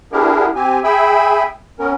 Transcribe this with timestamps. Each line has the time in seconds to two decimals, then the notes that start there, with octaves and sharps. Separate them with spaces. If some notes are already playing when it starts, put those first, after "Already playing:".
0.12 B3 D4 E4 G4 G#4 A#4
0.56 C4 G4 G#5
0.84 G#4 E5 G5 G#5 B5 E6
1.79 B3 C#4 A#4